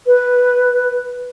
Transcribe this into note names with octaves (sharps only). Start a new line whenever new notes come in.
B4